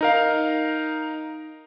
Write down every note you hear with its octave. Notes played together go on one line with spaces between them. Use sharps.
D#4 A#4 F5